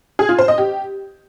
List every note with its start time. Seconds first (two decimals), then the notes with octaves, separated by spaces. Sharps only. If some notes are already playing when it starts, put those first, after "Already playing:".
0.19 G#4
0.29 F4
0.38 C5
0.48 D#5
0.58 G4